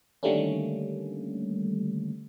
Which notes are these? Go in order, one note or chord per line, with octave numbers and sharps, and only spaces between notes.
D3 D#3 G3 A3 A#3 C#4